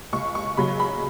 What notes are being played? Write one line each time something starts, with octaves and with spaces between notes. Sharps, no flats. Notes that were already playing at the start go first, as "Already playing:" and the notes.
C#2 C#6
C#6
C#3 F#3 B5
B5